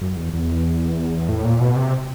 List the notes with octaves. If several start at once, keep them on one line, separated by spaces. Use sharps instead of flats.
F#2
E2
E2
A2
A#2
B2
C3